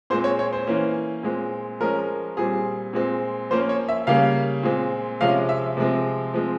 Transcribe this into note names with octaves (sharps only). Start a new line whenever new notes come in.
A#2 G#3 C4 C5
C#5
C#5
C5
E3 A#3 C#4
A#2 G#3 C4
F3 G#3 C#4 A#4
A#2 G3 C4 G#4
A#2 G#3 C4
F3 A#3 C#4 C5
C#5
E5
C#3 G3 A#3 C#4 F5
A#2 G#3 C4
C3 F3 G#3 C#4 F5
E5
C3 F3 G#3 C4
F3 G#3 C4